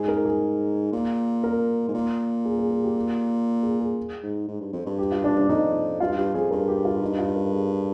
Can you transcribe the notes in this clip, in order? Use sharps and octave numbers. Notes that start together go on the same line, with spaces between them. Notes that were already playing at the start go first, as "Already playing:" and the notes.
Already playing: G#2 G#4
A#4
G#4
A#2
A#4
G#2
A#2
G#4
G#4
G#4
G4
G4
G#4
G#4
G#2
G#2
G2
F2
G2
G4
F4
D4
D4
F2 D#4
G2 F4
G2 G4
F2 G#4
G2 A#4
G4
F4
D#4
F4
A#4
G#4